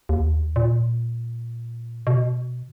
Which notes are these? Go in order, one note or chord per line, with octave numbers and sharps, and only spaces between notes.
D#2
A#2
B2